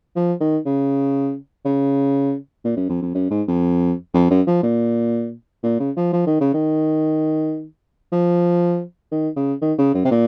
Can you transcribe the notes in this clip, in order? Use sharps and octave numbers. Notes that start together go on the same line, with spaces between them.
F3
D#3
C#3
C#3
A#2
F#2
F2
F2
F#2
G#2
F2
F2
F#2
F3
A#2
A#2
C#3
F3
F3
D#3
C#3
D#3
F3
D#3
C#3
D#3
C#3
F#2
C3
A#2